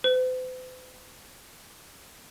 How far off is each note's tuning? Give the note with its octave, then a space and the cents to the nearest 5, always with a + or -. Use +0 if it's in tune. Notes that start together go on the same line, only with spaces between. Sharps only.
C5 -45